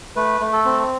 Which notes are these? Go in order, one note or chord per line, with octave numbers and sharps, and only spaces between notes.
A3 B4
A3
A4
C4